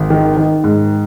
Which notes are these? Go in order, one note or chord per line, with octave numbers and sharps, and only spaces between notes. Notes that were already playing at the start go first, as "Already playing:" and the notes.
Already playing: G#1
D#3
D#3
G#2